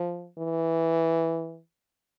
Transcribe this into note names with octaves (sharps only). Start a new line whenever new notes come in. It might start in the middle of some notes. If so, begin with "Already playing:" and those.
Already playing: F3
E3